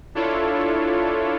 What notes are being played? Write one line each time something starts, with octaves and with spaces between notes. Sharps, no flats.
D4 E4 F4 A4 C#5